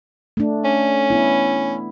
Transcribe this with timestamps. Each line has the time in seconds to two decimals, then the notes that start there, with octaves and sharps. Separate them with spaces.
0.37 A3 D4
0.64 C#4
1.10 B3 E4